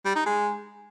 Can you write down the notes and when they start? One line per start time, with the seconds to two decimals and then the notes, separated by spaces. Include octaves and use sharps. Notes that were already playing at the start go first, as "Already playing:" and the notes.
0.05 G3
0.16 D#4
0.26 G#3